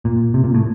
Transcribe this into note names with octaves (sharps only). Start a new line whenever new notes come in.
A#2
C3
A#2
A2